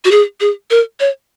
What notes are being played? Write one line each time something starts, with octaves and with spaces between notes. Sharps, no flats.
F#4
G#4
G#4
A#4
C#5